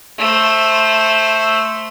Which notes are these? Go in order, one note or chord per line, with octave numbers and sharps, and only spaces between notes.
A3 C5